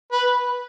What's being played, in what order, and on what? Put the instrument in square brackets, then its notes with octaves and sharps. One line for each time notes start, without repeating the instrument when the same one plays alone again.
[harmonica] B4